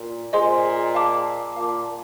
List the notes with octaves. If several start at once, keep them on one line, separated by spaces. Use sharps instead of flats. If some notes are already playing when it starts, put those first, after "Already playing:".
Already playing: A#2
A#2 G#4 C5 D#5 G#5 C6
F5 A5 D6
A#2 F5 A5 D6